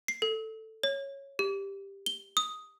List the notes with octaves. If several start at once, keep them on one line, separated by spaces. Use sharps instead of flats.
C7
A4
C#5
G4
G7
D#6